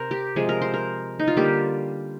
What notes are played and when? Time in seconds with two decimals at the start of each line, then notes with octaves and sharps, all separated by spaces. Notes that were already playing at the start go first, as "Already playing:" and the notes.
Already playing: C3 A#4 C5
0.11 G4
0.36 C3 F3 G#3 G#4
0.49 A#4
0.62 C5
0.74 A#4
1.19 D#4
1.28 F4
1.37 D3 G3 A#3 G4